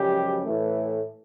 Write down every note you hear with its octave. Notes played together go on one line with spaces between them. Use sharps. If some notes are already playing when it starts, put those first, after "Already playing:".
Already playing: F#2 C#3 F3 G3 G#3 G4
A2 E3 A3